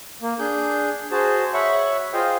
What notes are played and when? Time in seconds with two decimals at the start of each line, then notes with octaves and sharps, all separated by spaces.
0.22 A#3
0.39 D4 G#4 G6
1.12 F#4 G#4 C5 A5
1.54 C#5 E5 F#5 B5 C#6
2.13 F4 G#4 C5 D#5 F5 G5